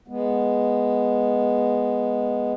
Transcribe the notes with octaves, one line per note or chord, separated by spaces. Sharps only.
G#3 B3